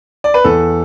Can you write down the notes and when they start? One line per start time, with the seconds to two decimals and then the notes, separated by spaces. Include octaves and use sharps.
0.24 D5
0.34 B4
0.44 E2 A4